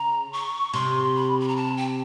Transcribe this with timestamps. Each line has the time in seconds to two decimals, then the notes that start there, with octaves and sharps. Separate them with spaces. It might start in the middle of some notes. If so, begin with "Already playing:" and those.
Already playing: C#3 A#5
0.33 C#6
0.74 C3 C6
1.15 B5
1.40 B5
1.48 A#5
1.56 A5
1.77 G5